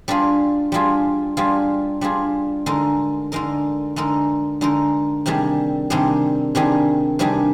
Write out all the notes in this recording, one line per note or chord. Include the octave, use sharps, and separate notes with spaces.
G3 D4 F4 G#4
G3 D4 F4 G#4
G3 D4 F4 G#4
G3 D4 F4 G#4
D3 G#3 D#4 A#4
D3 G#3 D#4 A#4
D3 G#3 D#4 A#4
D3 G#3 D#4 A#4
C3 D#3 G3 D4 G#4
C3 D#3 G3 D4 G#4
C3 D#3 G3 D4 G#4
C3 D#3 G3 D4 G#4